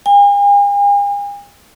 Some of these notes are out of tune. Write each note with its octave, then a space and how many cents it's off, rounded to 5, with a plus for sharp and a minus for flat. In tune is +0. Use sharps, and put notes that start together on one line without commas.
G#5 -45